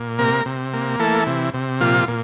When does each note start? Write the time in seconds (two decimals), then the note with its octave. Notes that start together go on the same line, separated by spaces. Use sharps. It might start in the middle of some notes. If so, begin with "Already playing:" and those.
Already playing: A#2
0.18 C3 A#3 A#4
0.46 C3
0.74 A#3
0.99 E3 A3 A4
1.27 C3
1.54 C3
1.81 A#2 F3 F4
2.08 A#2